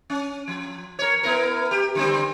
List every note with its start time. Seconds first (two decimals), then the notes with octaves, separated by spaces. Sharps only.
0.10 C#4
0.48 F3
0.99 A#4 C#5
1.23 B3 E4 A#4
1.71 G4
1.95 D3 G3 C4